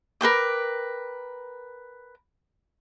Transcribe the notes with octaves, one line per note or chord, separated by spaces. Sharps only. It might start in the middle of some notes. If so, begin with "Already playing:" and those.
A#4 B4 G5 D6